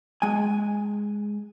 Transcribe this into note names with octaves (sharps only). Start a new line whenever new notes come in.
G#3 G#5